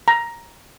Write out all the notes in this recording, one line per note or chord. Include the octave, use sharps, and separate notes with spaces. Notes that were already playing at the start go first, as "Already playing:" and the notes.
A#5